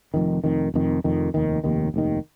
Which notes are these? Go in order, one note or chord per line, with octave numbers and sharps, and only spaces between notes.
F1 F2 D#3
F1 F2 D#3
F1 F2 D#3
F1 F2 D#3
F1 D#2 D#3
F1 D#2 D#3
F1 D#2 D#3